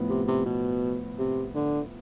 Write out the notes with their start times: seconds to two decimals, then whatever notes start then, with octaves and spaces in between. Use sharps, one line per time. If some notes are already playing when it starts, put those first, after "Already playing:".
Already playing: A2 F3 B3
0.10 C3
0.28 C3
0.46 B2
1.19 C3
1.55 D3